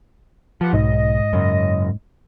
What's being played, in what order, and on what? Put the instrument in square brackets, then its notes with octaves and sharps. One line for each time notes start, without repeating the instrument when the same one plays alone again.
[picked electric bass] F3 [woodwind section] G4 B4 F#5
[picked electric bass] B1 [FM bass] G#2 [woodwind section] D#5
[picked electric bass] F#2 C#3